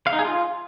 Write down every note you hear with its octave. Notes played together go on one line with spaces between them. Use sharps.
F5
D#4
G#4
F4